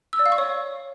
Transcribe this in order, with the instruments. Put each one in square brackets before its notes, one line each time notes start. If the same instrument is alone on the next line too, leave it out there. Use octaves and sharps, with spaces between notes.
[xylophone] E6
D5
F5
C#6
C#5